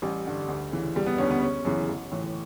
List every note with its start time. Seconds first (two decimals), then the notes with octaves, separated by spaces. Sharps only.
0.02 A1 G3
0.26 G2 D3
0.48 D2
0.72 C#3 E3
0.96 E1 G3
1.06 B3
1.18 D2 D3 C#4
1.30 B3
1.42 F#1 C#4
1.65 F#2 C#3 E3
1.88 A1
2.11 A2 E3